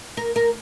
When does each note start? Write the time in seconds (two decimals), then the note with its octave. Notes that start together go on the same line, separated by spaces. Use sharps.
0.17 A#4
0.36 A#4